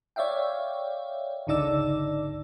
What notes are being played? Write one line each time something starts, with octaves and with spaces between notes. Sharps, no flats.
C#5 D5 E5 F5 G5
G#1 C#2 D3 D#4 D5 E6